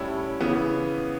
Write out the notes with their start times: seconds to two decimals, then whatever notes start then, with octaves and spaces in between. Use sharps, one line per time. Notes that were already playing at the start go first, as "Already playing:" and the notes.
Already playing: A2 G3 C#4 E4
0.41 C#3 E3 B3